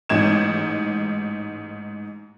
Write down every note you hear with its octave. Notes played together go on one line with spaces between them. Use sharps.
A1 G#2 G#6 E7